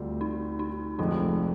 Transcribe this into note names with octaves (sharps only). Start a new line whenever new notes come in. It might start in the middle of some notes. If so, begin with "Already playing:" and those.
Already playing: D2 D3 G3 C4 F4
D#4
D#4
F1 F2 D3 G#3 D#4